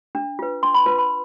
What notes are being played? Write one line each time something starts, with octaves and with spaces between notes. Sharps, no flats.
D4
F4 B4
D4 C6
B5
F4 B4
B5